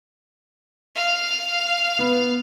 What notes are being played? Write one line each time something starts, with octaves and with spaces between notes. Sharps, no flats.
F5
B3